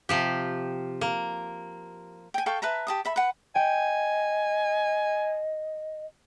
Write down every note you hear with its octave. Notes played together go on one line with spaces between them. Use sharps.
C3 F3 G4
A#3
G5 G#5
A4 F5 G5 C#6
B4 E5 A5 A#5
G4 A5 D#6
A4 E5 B5
B4 F#5
D#5 G5 G#5